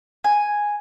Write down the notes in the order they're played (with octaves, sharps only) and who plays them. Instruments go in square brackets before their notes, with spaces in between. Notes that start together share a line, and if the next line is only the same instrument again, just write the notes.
[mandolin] G#5